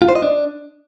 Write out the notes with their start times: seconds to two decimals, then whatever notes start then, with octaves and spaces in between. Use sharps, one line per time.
0.02 F4
0.09 C5
0.15 D#5
0.22 D4